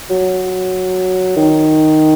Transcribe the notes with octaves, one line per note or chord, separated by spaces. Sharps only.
F#3
D#3